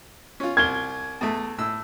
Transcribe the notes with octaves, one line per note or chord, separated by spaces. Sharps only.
C#4 F4
C2 F6 G#6 G7
E2 A3
A2 E6